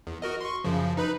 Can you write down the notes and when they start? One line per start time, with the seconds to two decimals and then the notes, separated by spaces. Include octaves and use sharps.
0.07 E2
0.22 F#4 A#4 D#5
0.41 C6 C#6
0.64 F#2 C#3 F3
0.97 D#4 B4 B5